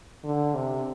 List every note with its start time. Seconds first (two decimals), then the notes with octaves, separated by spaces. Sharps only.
0.24 D3
0.55 C3